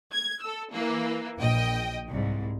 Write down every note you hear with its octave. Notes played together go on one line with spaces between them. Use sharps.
G#6
A4 E6
E3 A#3
A#1 D#5 G5
C2 G#2